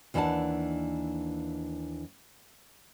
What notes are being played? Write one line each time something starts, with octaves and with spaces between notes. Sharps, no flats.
D#2 E3 D4 E5 F#5 A5